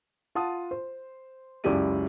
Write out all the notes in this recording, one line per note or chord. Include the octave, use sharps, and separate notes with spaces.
F4 F#5 A5 D#6
C5
C#2 F#2 E4 G4 D5 D#7